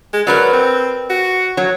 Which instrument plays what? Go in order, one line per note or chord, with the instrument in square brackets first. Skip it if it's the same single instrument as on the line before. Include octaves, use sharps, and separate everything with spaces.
[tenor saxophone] G#3
[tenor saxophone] F#3 [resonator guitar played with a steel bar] A#4 B4 D5
[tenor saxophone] C4
F#4
[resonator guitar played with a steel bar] F#3 C#5